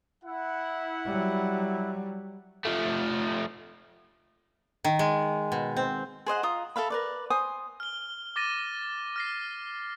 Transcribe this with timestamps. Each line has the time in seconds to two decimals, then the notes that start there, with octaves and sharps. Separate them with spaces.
0.24 E4 F#5
1.06 F#3 G3
2.65 F3 A3
4.84 D#3
4.99 G#3
5.52 B2
5.77 C4
6.26 G#4 C5 D#5 F#5
6.43 F4 A#5 D#6
6.76 A4 E5 F5 B5
6.90 A#4 B4 D5
7.30 C5 G#5 D#6
7.80 F6 G7
8.36 D6 A6 A#6 D#7
9.16 F6 A#6 C7